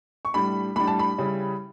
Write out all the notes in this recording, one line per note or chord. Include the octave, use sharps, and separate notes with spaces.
C#6
A2 G3 D4 B5
A2 G3 D4 B5
A5
B5
C#3 G3 C#4 E4